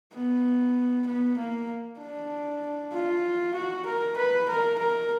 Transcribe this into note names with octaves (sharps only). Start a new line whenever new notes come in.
B3
B3
A#3
D4
F4
F#4
A#4
B4
A#4
A#4